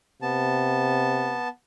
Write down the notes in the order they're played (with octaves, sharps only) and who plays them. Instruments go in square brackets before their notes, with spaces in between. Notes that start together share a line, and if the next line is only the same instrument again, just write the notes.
[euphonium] C3 [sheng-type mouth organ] B3 A5